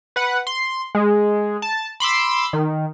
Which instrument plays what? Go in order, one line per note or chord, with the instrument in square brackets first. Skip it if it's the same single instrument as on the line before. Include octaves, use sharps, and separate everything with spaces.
[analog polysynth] B4 F#5
C6
G#3
A5
B5 C6 D6 E6
D#3